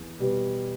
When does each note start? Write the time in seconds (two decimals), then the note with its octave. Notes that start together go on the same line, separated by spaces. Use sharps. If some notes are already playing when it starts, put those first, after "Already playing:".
Already playing: E2
0.19 B2 G3 B3